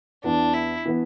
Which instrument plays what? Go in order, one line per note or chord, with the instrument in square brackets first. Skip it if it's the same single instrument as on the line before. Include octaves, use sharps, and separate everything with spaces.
[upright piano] E2 E3 B3 [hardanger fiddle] D4
[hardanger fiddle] E4
[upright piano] E3 B3